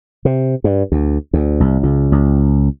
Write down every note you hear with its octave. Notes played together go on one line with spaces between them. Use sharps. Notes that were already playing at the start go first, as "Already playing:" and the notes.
C3
G2
D2
D2
C2
C#2
C#2